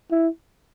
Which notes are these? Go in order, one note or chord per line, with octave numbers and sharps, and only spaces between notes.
E4